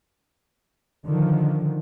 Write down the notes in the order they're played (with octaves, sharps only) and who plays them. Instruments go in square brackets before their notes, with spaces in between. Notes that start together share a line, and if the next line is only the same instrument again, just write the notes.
[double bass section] D3 D#3 F3